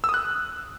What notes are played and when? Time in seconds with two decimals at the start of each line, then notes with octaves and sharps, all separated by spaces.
0.04 E6
0.09 D#6
0.14 F#6